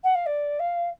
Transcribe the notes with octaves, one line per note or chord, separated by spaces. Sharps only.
F#5
F5
D5
F5